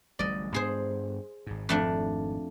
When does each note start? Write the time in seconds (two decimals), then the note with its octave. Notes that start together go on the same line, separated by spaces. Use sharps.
0.19 D1 A1 G3 D5 D#5
0.54 G2 B3 D4 G#4 C5
1.47 G#1 G#2
1.69 F2 A3 D4